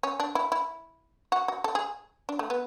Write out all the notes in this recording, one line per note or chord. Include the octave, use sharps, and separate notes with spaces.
C#4
D4
E4
E4
F#4
F#4
A4
G#4
D4
A3
B3